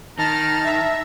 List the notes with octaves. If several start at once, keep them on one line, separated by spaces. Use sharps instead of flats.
D#3 A5 A#5 F6
E5